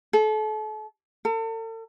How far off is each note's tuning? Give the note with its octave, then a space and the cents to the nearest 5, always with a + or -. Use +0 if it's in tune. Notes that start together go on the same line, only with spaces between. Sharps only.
A4 -35
A4 +40